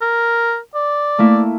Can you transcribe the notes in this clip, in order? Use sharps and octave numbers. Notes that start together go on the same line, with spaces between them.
A#4
D5
A3 A#3 E4